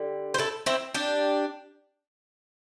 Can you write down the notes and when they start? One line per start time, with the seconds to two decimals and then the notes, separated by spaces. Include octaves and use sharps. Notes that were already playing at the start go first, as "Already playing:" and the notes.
Already playing: D3 G3
0.34 C5
0.38 E4 A4
0.66 C4 E4
0.94 D4 G4